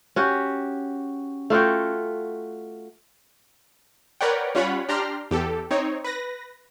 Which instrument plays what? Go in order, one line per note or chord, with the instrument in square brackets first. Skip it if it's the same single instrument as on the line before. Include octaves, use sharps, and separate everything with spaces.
[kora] C#4 F#4 G4
A3 F4 F#4 G5
[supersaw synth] A#4 B4 C#5 D5 F#5 G5
G3 C#4 F4 C#5 F#5 B5
D4 G4 A#5 C6 F6
E2 G4 A4
C4 D#4 C#5
B4 A#6